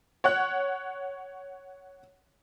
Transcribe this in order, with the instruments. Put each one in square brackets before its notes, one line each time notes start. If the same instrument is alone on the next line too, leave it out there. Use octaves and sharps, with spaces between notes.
[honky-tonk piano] C#5 F#5 F#6